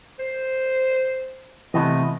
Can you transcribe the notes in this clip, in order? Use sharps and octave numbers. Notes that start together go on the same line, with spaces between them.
C5
C3 E3 A3 B3 D#5